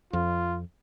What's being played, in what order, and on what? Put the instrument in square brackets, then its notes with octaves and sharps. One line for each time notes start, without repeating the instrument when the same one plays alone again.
[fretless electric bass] F2 [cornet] F4